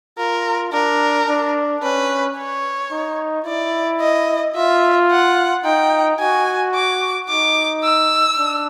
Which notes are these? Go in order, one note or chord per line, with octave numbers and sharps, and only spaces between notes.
F4 A#4
D4 A#4
D4
C#4 B4
C#5
D#4
E4 D5
D#5
F4 E5
F#5
D#4 G5
F#4 G#5
D6
D#4 D6
E6
D4